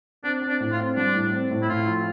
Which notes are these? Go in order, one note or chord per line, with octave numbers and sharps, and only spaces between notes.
C4 D4
C4
D4
A2
F4
C4
G3 D4
A2
C4
A2
E4
A2 F4
F3